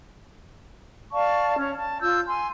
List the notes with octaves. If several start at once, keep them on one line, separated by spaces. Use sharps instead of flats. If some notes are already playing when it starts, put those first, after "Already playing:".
D5 F5 A5 C#6
C#4 C#5
A5
F4 E6 G6
G#5 C6